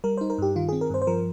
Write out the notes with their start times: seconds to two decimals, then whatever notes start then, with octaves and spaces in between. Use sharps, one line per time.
0.04 G3 A#4
0.17 D#4 C5
0.30 A#4
0.38 G2 G4
0.56 D#3 F4
0.69 C4 G#4
0.81 A#4
0.90 G2 C5
1.02 C5
1.07 F3 A#4